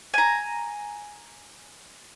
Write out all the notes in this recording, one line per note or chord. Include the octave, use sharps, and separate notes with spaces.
G#5 A#5